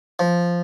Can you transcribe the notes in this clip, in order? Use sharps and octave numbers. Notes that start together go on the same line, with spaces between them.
F3